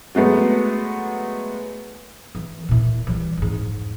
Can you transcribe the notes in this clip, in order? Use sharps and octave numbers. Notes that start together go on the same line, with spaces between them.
F#3 G#3 A3 B3
E3
A#2 E4
E3 G3
F2 G#2